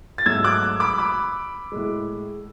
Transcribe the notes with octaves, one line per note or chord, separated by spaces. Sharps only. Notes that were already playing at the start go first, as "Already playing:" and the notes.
A6
G#2 F#3 A3 E6 G#6
D6 F#6
B5 D6
B5 D6
A2 G#3